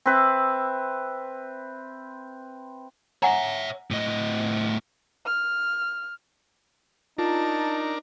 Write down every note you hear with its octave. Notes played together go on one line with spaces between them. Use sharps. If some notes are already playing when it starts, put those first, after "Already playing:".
C4 B4 E5
C#5 E5 F#5 G#5 A#5
A2 D#5
F6
D4 D#4 F4 A#4 A5